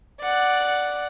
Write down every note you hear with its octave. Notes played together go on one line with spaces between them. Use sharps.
D5 F#5